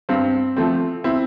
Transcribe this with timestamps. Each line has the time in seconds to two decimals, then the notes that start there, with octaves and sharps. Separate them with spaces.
0.09 G2 C4
0.57 F3 A3 C4
1.04 C4 E4